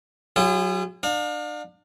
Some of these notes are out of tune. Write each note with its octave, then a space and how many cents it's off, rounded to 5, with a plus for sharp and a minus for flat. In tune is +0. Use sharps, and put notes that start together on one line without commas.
F#3 +0 F4 -45 G#4 -35
D4 +35 F5 +35